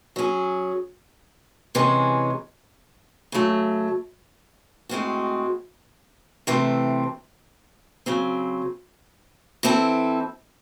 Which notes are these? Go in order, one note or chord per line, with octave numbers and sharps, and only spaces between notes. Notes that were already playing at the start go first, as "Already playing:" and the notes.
F#3 C#4 G#4
C3 E3 G#3 C#4
C#3 F#3 A3
A2 G#3 C4 F#4
C3 E3 A3 C4
C#3 F#3 C4
E3 C4 E4 A4